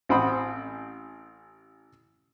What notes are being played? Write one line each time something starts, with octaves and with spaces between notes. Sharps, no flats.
A1 C4 F#5 B5 D#6